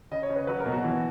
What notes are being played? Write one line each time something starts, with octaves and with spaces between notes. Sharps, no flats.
C#3 D#5
C#5
C#3
B4
F#3 B4
A#4
B2
F#4
E3